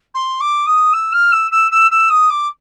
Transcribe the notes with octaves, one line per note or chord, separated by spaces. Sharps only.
C6
D6
D#6
E6
F6
E6
E6
E6
E6
D#6
D6